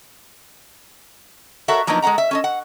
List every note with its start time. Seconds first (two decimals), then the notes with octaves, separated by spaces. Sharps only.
1.68 F#4 A4 A#4 C#5 E5 F#5
1.87 F3 F#3 A#3 B3 D4 D#4
2.02 G#3 A4 F5 F#5 A#5
2.18 E5
2.31 C#4 A4 D#5
2.44 F#5